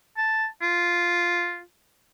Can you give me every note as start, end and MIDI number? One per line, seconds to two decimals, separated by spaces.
0.17 0.46 81
0.62 1.60 65